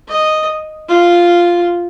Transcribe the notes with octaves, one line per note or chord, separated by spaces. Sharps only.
D#5
F4